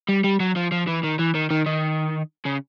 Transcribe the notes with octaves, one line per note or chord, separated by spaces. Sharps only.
G3
G3
F#3
F3
F3
E3
D#3
E3
D#3
D#3
D#3
C#3